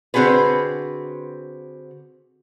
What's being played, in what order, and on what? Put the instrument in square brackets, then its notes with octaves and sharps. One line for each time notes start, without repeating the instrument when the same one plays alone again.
[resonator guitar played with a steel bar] D3 C4 F#4 G#4 B4